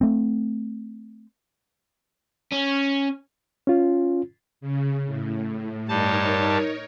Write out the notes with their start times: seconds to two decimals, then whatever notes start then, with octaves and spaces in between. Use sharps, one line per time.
0.01 A3 C4
2.52 C#4
3.67 C#4 F4
4.61 C#3
5.07 A2
5.89 G2 G3 D#4 A#4 C#5 A5